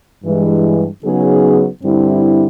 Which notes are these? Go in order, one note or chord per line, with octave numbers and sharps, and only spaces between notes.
G2 E3 G#3
C#3 F#3 B3 D#4 G#4
G2 D3 G3 C4 E4